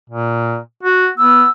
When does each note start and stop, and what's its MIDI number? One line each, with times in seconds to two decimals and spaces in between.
0.10 0.57 46
0.83 1.08 66
1.18 1.45 59
1.18 1.49 88